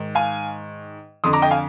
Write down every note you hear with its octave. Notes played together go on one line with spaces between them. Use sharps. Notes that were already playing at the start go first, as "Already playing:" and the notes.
Already playing: G#2 D#3
F5 G#5
F2 D3 C6 D#6
A#5 D6
D#5 G5
F5 G#5